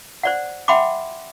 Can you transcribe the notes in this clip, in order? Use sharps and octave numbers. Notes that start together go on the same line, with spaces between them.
C5 D5 F#5
E5 F#5 G5 B5 C6 D6